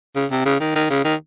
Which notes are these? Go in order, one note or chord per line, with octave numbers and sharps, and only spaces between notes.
C#3
C3
C#3
D#3
D#3
C#3
D#3